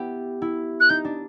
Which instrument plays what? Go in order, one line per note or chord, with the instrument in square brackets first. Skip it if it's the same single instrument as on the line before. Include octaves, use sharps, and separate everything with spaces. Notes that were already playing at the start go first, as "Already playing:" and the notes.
Already playing: [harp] B3 E4 G4
E4
[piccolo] F#6
[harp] D#4 [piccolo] G6
[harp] D4